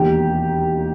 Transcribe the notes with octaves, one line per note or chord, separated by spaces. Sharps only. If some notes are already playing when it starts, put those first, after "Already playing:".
Already playing: E1 D#2 D#3 G4